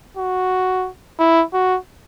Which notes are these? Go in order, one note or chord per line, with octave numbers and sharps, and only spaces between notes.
F#4
E4
F#4